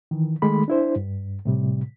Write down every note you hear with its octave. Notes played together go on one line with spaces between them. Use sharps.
D#3 E3
D#3 G#3 A3 B5
D4 E4 C5
G2
A2 C3 G3